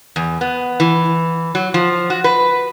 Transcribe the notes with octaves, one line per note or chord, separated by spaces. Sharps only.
E2
B3
E3
F#3
F3
F#4
B4